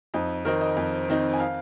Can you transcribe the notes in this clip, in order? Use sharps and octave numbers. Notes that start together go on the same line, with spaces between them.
F2 D#4
D#3 C4 D#4 A#4
D#5
F2
D#3 C4 D#4
G#5
F5